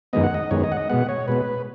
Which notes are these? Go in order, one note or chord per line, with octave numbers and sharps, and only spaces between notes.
F#2 D#3 G#3 B3 D#5
F#5
D#5
F#2 D#3 G#3 B3 C#5
D#5
F#5
D#5
B2 G#3 B3 F#5
C#5
B2 G#3 B3 B4